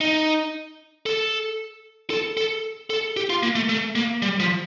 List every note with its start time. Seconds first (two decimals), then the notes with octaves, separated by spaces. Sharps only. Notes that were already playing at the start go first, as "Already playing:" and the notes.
0.01 D#4
1.06 A4
2.10 A4
2.37 A4
2.90 A4
3.17 G4
3.30 F4
3.43 A#3
3.55 A3
3.69 A3
3.95 A#3
4.22 G3
4.40 F3